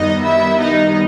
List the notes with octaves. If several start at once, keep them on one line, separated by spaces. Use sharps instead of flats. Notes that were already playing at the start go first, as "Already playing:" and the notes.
Already playing: F#2 D#3 G3 B3 D#4 D#5
E4 E5
D#4 D#5